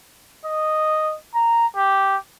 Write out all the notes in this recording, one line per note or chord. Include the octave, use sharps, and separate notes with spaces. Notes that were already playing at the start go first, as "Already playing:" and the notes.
D#5
A#5
G4